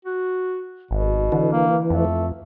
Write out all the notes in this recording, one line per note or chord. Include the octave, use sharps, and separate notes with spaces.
F#4
G#1 B2
D3 E3
A#3
F2 A3